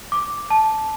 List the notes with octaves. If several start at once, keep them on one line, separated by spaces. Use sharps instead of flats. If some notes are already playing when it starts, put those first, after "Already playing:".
D6
A5